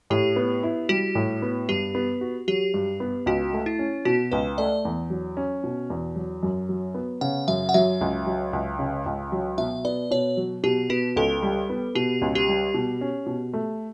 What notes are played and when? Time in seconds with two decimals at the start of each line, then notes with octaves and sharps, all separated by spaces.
0.10 A2 G4
0.36 B3
0.63 E4
0.89 G3 F#4
1.15 A2
1.42 B3
1.69 G2 G4
1.95 B3
2.21 F#4
2.48 F#3 G4
2.74 G2
3.00 B3
3.26 C#2 F#4
3.53 A3
3.66 E4
3.79 C#4
4.05 B2 F#4
4.32 C#2 B4
4.58 A3 D5
4.85 E2
5.10 F#3
5.37 C#4
5.64 B2
5.90 E2
6.16 F#3
6.43 F#2
6.69 F#3
6.94 B3
7.21 C#3 F#5
7.48 F#2 E5
7.69 F#5
7.74 F#3 E5
8.01 C#2
8.26 F#3
8.53 C#2
8.79 C#3
9.06 C#2
9.32 F#3
9.58 B2 E5
9.85 B3 D5
10.11 B2 C#5
10.37 F#3
10.63 B2 G4
10.90 B3 F#4
11.16 C#2 A4
11.42 G3
11.70 B3
11.95 B2 G4
12.22 C#2
12.35 G4
12.49 G3
12.74 B2
13.01 C#4
13.26 B2
13.53 A3